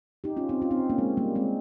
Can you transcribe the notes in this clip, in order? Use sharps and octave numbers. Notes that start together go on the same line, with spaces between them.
D#4 G4
C#4 F4
C4 D#4
C#4 F4
C4 D#4
A#3 C#4
G#3 C4
G3 A#3
G#3 C4